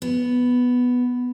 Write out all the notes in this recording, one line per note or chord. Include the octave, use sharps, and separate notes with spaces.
B3